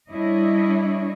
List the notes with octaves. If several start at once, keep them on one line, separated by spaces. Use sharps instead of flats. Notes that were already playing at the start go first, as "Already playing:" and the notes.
G3 D4 E4 C#5 D#5